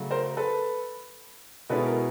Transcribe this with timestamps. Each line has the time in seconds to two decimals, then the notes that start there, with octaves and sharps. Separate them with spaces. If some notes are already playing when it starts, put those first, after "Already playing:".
Already playing: C#3 F#3 A3
0.11 A#4 C5
0.37 A4 B4
1.70 B2 G#3 C#4 E4 A4 B4
1.86 A#4